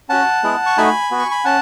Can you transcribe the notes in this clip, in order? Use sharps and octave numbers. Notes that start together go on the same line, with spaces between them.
C#4 F#4 F#5 A5
G#3 B3 E4 G#4
C#6
A3 D#4 F#4 G#5 B5
B3 F#4
C#6
B5
C#4 F#5 A5